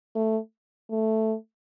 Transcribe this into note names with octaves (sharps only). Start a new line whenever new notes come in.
A3
A3